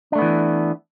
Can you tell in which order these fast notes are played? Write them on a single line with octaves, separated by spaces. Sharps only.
D4 A3 B3 E3